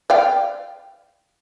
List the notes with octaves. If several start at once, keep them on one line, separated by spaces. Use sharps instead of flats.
D5 F5 G5